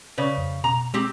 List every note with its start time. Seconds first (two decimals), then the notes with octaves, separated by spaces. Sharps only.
0.18 C#3 B4 C#5 D5
0.38 F2
0.64 B2 A#5
0.94 G#3 C4 G4